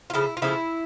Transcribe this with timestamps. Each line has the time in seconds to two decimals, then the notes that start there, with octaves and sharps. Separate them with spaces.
0.10 F4
0.14 C#3 F3 A3 E4
0.37 F4
0.42 C#3 F3 A3 E4